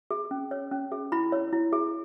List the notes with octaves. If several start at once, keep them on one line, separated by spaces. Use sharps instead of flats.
G#4
C#4
C#5
C#4
G#4
E4 B5
C#5
E4
G#4